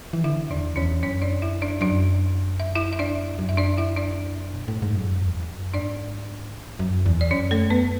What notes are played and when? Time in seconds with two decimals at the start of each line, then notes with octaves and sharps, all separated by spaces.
0.13 E3
0.24 D3 E4 E5
0.50 E2 D4 D5
0.76 E2 C#4 C#5
1.03 F#2 C#4 C#5
1.22 D4 D5
1.42 E4 E5
1.62 D4 D5
1.81 F#2 D4 D5
2.60 E5
2.75 E4 E5
2.93 E5
2.99 D4 D5
3.39 F#2
3.49 E5
3.57 D4 D5
3.78 E4 E5
3.97 D4 D5
4.54 B2
4.68 A2
4.82 G#2
4.95 F#2
5.22 E2
5.48 F#2
5.74 G#2 D4 D5
6.53 A2
6.79 F#2
7.06 E2
7.21 D5
7.31 F#2 C#4 C#5
7.51 A3 A4
7.70 B3 B4